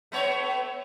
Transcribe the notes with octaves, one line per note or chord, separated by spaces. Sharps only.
A3 B3 C#5